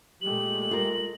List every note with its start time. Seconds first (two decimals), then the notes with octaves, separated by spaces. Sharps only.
0.21 A#2 G#3 A3 G4 F#7
0.71 F4 A#4